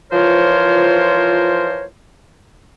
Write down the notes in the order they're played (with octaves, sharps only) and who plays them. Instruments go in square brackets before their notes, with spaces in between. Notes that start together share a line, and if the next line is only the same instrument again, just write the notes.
[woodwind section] E3 F3 F4 A#4 C5 C#5